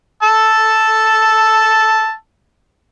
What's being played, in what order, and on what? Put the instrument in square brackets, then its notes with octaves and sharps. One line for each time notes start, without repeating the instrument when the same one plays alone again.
[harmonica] A5 E6